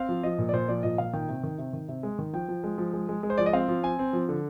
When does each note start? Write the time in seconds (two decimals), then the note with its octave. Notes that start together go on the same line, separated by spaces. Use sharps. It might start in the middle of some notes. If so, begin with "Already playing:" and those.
Already playing: C4 F5
0.09 F3
0.23 F3 D#5
0.39 A#2
0.49 D5
0.53 A#2 C5
0.68 F3 D5
0.83 A#2 D#5
0.98 A#2 F5
1.13 D#3 G5
1.29 C3
1.43 D#3
1.58 C3
1.73 D#3
1.89 C3
2.03 G#3
2.19 D#3
2.33 F3 G5
2.49 F3
2.64 G#3
2.78 F3
2.93 G#3
3.09 G#3
3.23 G#3
3.30 C5
3.38 F3 D5
3.46 D#5
3.53 C4 F5
3.68 F3
3.83 C4 G#5
3.99 C4
4.13 F3
4.29 D3